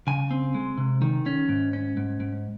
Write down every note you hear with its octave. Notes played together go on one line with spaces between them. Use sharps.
C#3 G#5
C4
G#3
C3
D#3
C#4
G#2
C#4
G#2
G#2